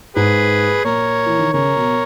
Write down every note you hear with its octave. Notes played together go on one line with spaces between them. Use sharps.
G#2 G#4 B4
A#2 A#4 C#5
E3
D#3
C#3 A#4 C#5
B2